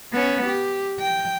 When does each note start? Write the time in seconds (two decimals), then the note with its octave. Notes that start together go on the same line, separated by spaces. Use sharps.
0.12 B3 C#4
0.46 G4
1.01 G5